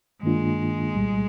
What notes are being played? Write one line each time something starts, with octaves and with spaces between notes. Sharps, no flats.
G2 D#3 G#3 A#3 D4 F4
C2 A#2 G3